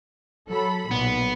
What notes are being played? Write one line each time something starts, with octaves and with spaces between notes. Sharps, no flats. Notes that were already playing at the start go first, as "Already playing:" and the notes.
F#3 A4 B5
B1 A#2 B3